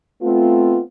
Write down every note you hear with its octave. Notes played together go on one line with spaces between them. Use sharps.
A3 B3 C4 F4